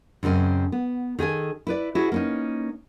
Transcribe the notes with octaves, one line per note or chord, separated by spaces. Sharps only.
F#2 C#3 F#3 C4 D#5
B3
D#3 G#4 A4 G#5
E4 B4 D5
E4 F#4 G#4 C#5
A#3 C#4 D#4